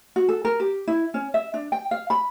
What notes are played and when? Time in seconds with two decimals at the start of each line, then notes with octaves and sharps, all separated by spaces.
0.16 F#4
0.29 A4
0.45 A#4
0.60 G4
0.88 E4
1.14 C#4
1.34 E5
1.54 D4
1.72 G5
1.91 F5
2.10 B5